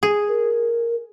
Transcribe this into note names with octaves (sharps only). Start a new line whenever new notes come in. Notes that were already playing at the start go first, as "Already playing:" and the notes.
G#4
A#4